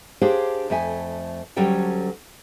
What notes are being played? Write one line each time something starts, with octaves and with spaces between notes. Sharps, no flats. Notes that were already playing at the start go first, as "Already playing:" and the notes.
D4 G4 G#4 C5 C#5 F5
F2 A3 E5 G#5
D2 F#3 G3 C#4 A4 G5